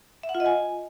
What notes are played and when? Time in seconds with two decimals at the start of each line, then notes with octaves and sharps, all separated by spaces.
0.23 E5
0.29 F#5
0.35 F4
0.40 D#5
0.46 G#5